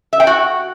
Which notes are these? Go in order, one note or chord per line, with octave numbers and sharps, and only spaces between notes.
E5
G5
F#4